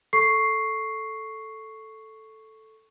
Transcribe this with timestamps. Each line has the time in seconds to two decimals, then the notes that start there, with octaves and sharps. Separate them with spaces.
0.13 A4 C#6 C7